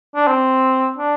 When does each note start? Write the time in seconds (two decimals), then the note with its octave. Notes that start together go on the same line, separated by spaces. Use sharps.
0.16 D4
0.27 C4
0.98 D4